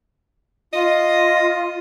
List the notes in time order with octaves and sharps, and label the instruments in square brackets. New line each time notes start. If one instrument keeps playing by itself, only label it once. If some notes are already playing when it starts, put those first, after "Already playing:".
[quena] F4 [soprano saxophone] D#5